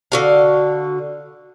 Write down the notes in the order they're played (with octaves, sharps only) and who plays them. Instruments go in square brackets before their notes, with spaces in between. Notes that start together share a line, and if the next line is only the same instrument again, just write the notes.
[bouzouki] D3 F#4 F5